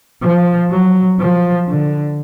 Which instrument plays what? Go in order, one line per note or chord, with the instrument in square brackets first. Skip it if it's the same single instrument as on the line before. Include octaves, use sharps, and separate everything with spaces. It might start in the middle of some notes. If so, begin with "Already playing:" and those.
[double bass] F3
F#3
F3
D3